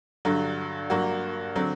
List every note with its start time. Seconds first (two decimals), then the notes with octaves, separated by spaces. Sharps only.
0.25 G2 D3 F#3
0.90 G2 F#3 A#3 F#4
1.56 D3 F#3 C4